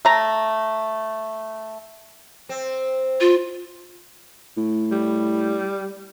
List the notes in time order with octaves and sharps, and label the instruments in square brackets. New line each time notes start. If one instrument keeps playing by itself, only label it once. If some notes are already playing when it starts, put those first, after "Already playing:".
[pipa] A3 A#5
[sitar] C4
[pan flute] F4
[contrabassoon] A2
[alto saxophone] G3